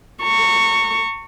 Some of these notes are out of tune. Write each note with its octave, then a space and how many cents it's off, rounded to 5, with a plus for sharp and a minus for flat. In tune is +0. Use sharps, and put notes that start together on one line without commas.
A#5 -35 C#6 +0